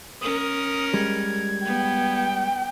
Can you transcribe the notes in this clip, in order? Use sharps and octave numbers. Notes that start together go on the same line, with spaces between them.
C#4 A#4 D#6
G3 G#3 G#6
B3 G5